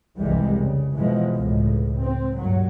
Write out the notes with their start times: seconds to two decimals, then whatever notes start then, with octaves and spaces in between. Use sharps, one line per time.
0.20 F1 C2 E3 G3 G#3
0.59 C#3
0.96 B2 E3 F3 G#3
1.35 C#2 A2
1.97 C4
2.36 G2 A#2 F#3